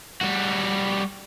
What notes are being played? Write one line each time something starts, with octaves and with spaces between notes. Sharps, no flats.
G3 F#4